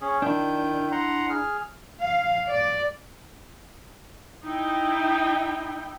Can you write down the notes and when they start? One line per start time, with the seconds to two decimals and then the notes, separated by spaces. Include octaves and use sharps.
0.01 C#4 G#4
0.22 D#3 D4 E4 G6
0.92 F#5 A#5 C6
1.30 G#4 F6
2.00 F5
2.47 D5
4.43 D#4 E4 G5